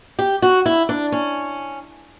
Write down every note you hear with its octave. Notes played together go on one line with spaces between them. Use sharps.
G4
F#4
E4
D4
C#4